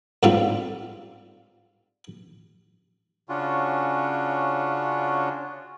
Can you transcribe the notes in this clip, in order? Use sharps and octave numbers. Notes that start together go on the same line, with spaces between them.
G#2 D3 G3 C4 F4
C#3 C#4 D4 F4 F#4